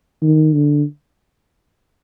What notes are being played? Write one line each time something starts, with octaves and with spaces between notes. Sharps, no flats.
D#3
D3